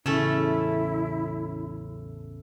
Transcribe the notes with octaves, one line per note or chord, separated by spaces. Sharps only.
A1 E2 C#3 A3 C#4 E4 A4 E6